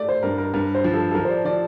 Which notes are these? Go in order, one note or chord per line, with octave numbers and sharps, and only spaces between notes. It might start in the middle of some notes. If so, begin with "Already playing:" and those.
Already playing: A3 D5
C5
G2 A#4
A#4
G2 A#4
C5
F3
A4
A4
F3 A#4
C5
D5
F3 D5